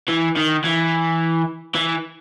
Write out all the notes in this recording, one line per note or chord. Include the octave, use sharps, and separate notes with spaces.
E3
D#3
E3
E3